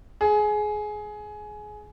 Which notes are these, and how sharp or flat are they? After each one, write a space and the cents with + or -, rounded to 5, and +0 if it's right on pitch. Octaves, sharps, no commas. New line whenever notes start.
G#4 +20